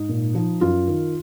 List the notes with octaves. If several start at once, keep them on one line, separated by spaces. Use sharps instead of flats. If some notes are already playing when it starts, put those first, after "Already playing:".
Already playing: G#2 D#4
A#2
F3
F#2 F4
D#3